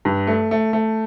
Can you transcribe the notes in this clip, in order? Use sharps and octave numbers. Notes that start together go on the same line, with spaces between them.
G2
A3
A3
A3